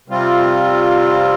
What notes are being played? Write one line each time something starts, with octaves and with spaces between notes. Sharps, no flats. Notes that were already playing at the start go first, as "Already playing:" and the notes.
C3 G3 C4 F4